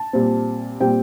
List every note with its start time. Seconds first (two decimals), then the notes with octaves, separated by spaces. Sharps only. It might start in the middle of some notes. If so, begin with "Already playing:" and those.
Already playing: A5
0.13 A#2 G3 C4
0.80 A#2 G3 C4 G5